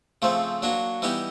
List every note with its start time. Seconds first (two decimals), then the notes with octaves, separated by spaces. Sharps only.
0.22 C#3 F3 A3 C4
0.62 F#3 A#3 D4 F#4
1.02 E3 G3 B3 D#4 G4